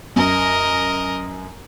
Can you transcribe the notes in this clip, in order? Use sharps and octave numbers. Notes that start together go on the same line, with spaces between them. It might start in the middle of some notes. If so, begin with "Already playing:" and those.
F#2 A#4 D#5